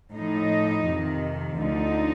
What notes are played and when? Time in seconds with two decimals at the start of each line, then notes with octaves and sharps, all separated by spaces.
0.15 A2 F3 D#4
0.87 F2 C3 D#3
1.58 D2 D3 F3 D#4